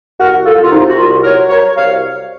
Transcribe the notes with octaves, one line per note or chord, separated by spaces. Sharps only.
C2 F#4 A#4
C2 F4 A4
F4
C3 D#4
F#4
C2 F4
F#3 A#4 C#5
F#3 A#4 C#5
C2 C#5 F5